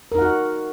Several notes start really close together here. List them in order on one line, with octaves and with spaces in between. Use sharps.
A#4 D#4 F#5 F#4